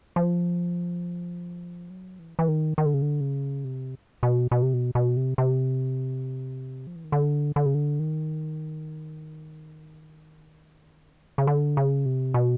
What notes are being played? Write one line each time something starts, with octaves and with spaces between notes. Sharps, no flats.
F3
F#3
E3
E3
D#3
D#3
D3
C#3
D3
C#3
C3
B2
B2
C3
B2
B2
C3
C3
F3
E3
D#3
D3
D3
C#3
D3
D#3
C#3
D3
C#3
C3
B2